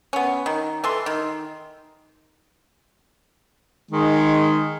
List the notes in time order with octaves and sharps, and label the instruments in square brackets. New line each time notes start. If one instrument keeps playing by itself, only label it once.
[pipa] B3 C#4
D#3
E3 A4 C6
D#3
[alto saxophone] D#3 [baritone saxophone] G#3